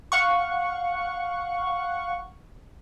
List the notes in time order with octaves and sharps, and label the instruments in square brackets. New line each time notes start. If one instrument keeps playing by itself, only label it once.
[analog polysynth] F5 F#5 C#6